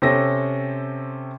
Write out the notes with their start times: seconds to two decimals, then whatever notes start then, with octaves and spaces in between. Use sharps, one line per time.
0.02 C3 C4 C#4 A4 A#6